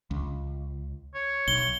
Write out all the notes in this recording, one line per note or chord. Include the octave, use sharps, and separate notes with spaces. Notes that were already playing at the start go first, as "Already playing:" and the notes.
C#2
C#5
B1 G7